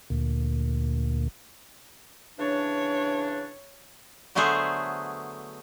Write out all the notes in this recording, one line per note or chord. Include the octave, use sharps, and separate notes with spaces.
D2 A#2
C#3 E3 D4 C#5
D3 F#3 A3 B3 G#4 C5